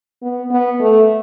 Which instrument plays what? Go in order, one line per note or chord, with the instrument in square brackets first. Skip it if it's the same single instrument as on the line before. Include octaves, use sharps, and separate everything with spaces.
[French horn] B3
B3
A3